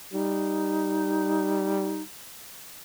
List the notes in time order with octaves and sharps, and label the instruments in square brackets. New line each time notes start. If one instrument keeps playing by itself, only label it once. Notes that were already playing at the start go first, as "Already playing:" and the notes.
[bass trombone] G3 [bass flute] D#4